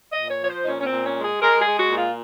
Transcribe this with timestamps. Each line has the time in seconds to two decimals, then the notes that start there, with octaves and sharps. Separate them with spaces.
0.11 D#5
0.18 A#2
0.30 C#5
0.42 F3 C#5
0.49 C5
0.63 D#4
0.67 A#2 C#4
0.80 C#4
0.85 C4
0.91 A#2
1.04 C#4
1.17 G#3
1.23 G#4
1.41 G#3 A#4
1.60 G#4
1.66 G#3
1.79 F#4
1.91 A#2
1.97 F4